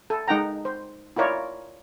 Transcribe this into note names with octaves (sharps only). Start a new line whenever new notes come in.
A4
G#3 D#4 F#5 G5 A#5
C5
E4 F4 A#4 C#5 D5